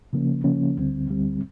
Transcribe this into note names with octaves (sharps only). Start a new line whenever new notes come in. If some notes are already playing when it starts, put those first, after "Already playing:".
C#3 F3 A#3 C#4
C#3 F3 A#3 C#4
D2 D3 G3 C4
D2 D3 G3 C4